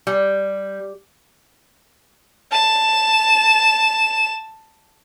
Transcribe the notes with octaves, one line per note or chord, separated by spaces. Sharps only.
G3
A5 E7